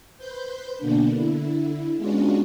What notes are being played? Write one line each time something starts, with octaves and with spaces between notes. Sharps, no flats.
B4 C5 G6
B2 D3 A#3 B3 D4
D3 E4
G#3 B3 C#4 D4 F4 F#4